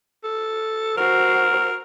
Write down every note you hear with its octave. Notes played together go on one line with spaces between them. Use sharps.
A4
F#4 A#4 C5